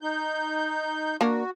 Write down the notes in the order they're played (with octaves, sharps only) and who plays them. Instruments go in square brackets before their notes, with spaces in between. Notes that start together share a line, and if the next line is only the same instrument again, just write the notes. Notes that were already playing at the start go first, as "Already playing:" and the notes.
[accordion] D#4 G6
[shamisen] A#3 D4 A#4 [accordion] F#4